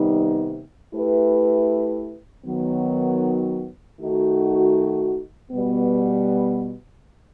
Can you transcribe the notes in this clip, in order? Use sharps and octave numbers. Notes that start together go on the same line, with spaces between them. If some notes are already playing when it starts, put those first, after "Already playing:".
Already playing: C3 D#3 G3 B3 D#4
A3 E4 G4 B4
D#3 F#3 B3
D#3 A3 D#4 F#4
B2 G3 B3